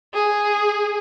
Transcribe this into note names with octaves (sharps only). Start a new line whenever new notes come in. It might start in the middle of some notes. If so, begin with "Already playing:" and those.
G#4